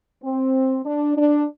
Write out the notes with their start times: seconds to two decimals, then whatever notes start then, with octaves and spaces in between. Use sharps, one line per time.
0.24 C4
0.86 D4
1.17 D4